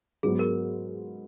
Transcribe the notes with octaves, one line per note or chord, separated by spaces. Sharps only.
G#2 F#3 B3 G#4
A#4